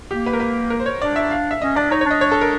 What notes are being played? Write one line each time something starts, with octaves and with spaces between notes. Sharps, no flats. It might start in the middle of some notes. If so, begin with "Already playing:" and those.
A#3 G4
B4
A#4
B4
A#4
C5
C#5
D4 D5
E5
F5
E5
C#4 D#5
D4 D5
D#4 C#5
C#5
D4 D#5
C#5
A4
A#4